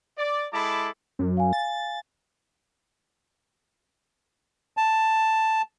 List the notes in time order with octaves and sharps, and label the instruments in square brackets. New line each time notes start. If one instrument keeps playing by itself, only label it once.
[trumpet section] D5
G#3 E4 A4 A5 B5 D6
[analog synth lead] F#2
[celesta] F5 G#5
[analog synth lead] A6
[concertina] A5